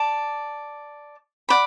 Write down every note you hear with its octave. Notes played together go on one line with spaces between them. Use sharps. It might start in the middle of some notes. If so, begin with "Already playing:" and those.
Already playing: D5 A5 D6
D5 F#5 B5